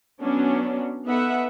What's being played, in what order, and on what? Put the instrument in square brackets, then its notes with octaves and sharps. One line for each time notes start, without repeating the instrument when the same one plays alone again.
[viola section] F#3 B3 C#4 D4
B3 D#4 A4 B4 E5 F#5